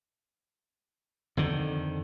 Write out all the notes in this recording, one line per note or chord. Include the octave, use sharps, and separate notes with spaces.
F2 D3 D#3